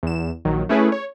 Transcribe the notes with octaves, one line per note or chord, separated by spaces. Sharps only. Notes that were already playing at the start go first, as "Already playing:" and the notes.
E2 E7
A#1 D#3 F#3
A3 C#4 E4 G#4 B4
C#5